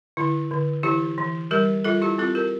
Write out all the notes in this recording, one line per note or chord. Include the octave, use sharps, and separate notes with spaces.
D3 E4
D3
E3 E4 G4
E3
G3 G4 A#4
G3 F4 A4
E4 G4
C4 F4 A4
G4 A#4